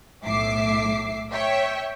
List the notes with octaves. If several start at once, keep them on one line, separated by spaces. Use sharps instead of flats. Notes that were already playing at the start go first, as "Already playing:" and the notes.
B1 A2 E5 D6 C7
C#5 E5 G5